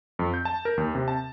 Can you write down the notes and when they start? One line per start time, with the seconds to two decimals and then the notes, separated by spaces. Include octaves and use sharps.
0.19 F2
0.34 G6
0.45 A5
0.65 A#4
0.77 D#2
0.95 C3
1.08 A5